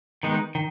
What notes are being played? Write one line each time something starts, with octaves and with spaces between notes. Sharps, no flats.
D#3 G#3 B3 D#4
D#3